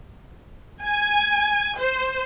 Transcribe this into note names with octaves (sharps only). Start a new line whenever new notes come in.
G#5
C5